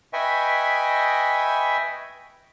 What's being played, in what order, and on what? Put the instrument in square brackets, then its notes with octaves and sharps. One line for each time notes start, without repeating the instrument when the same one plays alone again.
[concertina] B4 D#5 E5 G5 G#5 C#6